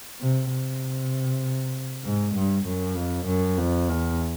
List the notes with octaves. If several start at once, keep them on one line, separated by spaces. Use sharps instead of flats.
C3
C3
G#2
G2
F#2
F2
F#2
F2
E2